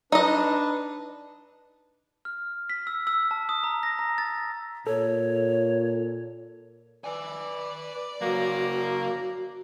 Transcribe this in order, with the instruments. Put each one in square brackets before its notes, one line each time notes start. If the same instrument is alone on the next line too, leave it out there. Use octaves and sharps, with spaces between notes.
[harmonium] D4 B4 [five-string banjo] D#4 D#5
[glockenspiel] F6
B6
E6
E6
A5
D#6
A#5
A#6
A#5
A6
[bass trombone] A#2 [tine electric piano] A4 [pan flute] C#5
[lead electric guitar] B4 G#5 [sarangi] D5
[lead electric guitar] C#3 F#3 [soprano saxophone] A#3 [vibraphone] F#4